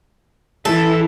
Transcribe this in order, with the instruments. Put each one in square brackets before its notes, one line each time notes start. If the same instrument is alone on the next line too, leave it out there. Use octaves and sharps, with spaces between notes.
[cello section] E3 E4 [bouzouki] A4